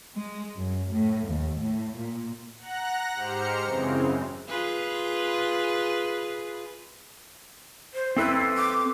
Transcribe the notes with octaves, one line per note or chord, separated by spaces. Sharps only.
G#3
F#2
A2
D#2
A2
A#2
F#5 A#5 F#6 A#6
G#2 G4 C5 A#5 F6 C#7
F#2 C#3 E3 G#3 C4
F4 G#4 B4
C5
C4 E4 A4 B4
D6